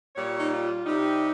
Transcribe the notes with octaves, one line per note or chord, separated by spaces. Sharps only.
A#2 G3 C#5
D#4
F4
C3 G3 D#4